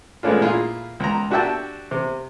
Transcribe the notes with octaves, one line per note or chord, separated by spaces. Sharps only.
G#3 A3 B3 C#4 D4 F4
A#2 E4 F4 G#4
C#2 A#5
D4 F#4 G4 E5 G5 A5
C3